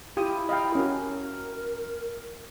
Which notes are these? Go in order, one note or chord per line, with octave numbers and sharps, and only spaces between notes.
E4 F4 G4 D#6
D#5 F5 G5
C#4 F#4 A#4